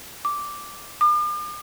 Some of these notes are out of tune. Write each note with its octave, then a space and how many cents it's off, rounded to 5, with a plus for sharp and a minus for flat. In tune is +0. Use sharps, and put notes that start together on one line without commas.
D6 -5
D6 +45